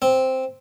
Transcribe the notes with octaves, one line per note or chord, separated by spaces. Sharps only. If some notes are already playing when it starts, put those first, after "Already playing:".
C4